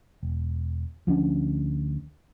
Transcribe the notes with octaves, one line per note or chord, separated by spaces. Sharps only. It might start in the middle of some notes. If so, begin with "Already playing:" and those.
E1
D2 F3 C#4 D4